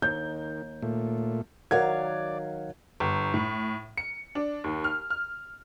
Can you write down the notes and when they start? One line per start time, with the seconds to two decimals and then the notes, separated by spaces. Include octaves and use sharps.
0.02 D#2 D#3 G6
0.82 A#2 A3
1.71 D#3 F#3 A#4 D5 F5 F#5 G#6
3.00 G1
3.34 A2
3.98 C#7
4.35 D4
4.64 D#2
4.84 F6
5.10 F6